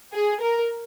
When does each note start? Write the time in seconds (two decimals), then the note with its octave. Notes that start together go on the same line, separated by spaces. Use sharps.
0.13 G#4
0.41 A#4